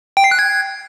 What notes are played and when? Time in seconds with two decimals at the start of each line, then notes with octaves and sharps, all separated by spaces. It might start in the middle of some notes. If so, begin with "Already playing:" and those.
0.17 G5
0.24 C7
0.31 F#6
0.39 G#6